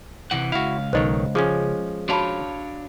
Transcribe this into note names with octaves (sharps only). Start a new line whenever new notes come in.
C3 E3 F#5
C#2 E4 F#4 F5
B1 D#3 C5 C#5 D#5
F3 G#3 C#4 G#4
D4 F#4 C#5 F5 A5 B5